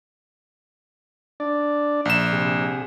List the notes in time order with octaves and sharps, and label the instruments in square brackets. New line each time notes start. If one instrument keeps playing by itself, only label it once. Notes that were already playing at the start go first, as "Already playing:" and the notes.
[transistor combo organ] D4 D5
[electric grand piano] A#1 E7
[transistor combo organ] C3 G#4